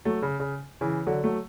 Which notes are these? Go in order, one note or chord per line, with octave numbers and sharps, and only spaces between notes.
F#3 A3
C#3
C#3
C#3 E3
D3 F#3
F#3 A3